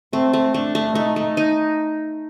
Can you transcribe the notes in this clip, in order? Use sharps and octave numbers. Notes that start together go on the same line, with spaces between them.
A3 C4
A3
A3 D4
A3
A3 D#4
A3
D#4